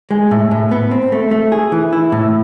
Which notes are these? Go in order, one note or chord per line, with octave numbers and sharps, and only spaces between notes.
G#3
A2
A2
B3
C4
A3
A3
G#4
E3
E4
A2